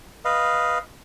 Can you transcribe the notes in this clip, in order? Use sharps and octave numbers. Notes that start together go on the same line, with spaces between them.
B4 D#5 F5